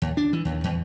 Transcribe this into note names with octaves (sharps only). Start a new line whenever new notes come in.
D#2
D4
E3
D#2
E2